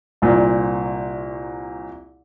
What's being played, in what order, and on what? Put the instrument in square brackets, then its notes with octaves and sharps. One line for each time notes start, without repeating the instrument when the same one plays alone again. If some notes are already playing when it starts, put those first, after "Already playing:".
[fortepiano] C2 A#2